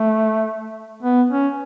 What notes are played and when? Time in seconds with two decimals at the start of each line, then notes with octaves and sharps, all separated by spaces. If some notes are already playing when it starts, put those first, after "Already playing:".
Already playing: A3
1.03 B3
1.30 C#4